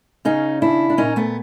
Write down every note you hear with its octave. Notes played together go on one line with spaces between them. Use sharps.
C#3 C#4 D#4
D#2 D4 E4
D4
A#2 C#4 D#4
A3 B3